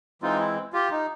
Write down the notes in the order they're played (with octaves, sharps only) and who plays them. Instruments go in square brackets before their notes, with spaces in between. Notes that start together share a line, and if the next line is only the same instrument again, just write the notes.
[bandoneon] E3 G#3 C4 D#4 F4
E4
F4 G4
D#4